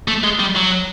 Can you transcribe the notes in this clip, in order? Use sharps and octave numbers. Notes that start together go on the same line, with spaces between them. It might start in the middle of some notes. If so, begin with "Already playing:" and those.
A3
G#3
G3
F#3